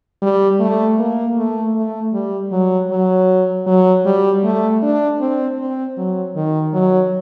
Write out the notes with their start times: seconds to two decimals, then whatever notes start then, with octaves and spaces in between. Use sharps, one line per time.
0.22 G3
0.60 A3
0.99 A#3
1.37 A3
1.75 A3
2.13 G3
2.52 F#3
2.90 F#3
3.67 F#3
4.05 G3
4.44 A3
4.82 D4
5.20 C4
5.59 C4
5.97 F#3
6.35 D#3
6.74 F#3